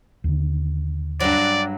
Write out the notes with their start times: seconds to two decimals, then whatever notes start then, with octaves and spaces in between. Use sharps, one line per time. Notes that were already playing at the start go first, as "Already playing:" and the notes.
0.24 D#2 D3
1.20 G2 F#3 D5